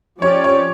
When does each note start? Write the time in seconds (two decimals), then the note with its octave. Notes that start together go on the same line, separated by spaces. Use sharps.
0.21 F3 C#4 G4 C#5 D5
0.44 C#5